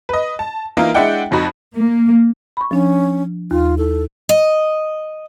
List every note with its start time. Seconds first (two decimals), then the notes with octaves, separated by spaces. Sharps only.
0.09 B4 D#5
0.39 A5
0.77 E3 A#3 D#4 F4 A#4
0.94 G#3 D4 E4 D5 F#5 G5
1.31 F1 F2 D#4 F#4 B5
1.75 A#3
2.57 B5 C#6
2.71 F3 C#4 D4
3.51 D#2 F4
3.78 E4 A4
4.29 D#5